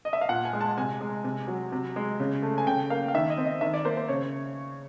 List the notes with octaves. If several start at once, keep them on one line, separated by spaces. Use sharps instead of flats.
D#5
E5
F5
A#2 F#5
G#5
G#3
A5
C3 G#5
G#3
C3
F#3
C3
G#3
C#3
A3
G#5
C#3 G5
A#3 F5
F5
D#3 E5
D#5
C4
D#5
D#3 E5
D5
A#3 C5
C5
C#3 C#5